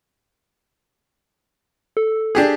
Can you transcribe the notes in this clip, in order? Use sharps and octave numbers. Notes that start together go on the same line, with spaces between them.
A4
D4 G4 G#4